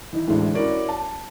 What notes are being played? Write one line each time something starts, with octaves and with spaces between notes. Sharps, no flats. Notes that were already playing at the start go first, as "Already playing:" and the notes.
E3 D#4
A1 D2 D3 E3 G#3
C#4 E4 F#4 A#4 C#5 D5
A5